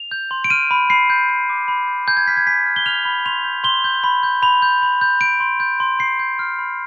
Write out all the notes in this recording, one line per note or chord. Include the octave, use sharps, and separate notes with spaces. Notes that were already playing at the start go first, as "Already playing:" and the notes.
Already playing: F7
G6
C6
D7
F6 D#7
B5
B5 C7
G6
G6
D6
B5
G6
G#5 G6
G#6
F6 B6
G#6
G#5 B6
F6
G7
F6 F7
B5
C6 F7
G6
C6 G7
G6
B5
G6
B5 F7
G6
B5
G6
G6 D7
C6
G6
C6
C6 C7
G6
F6
B5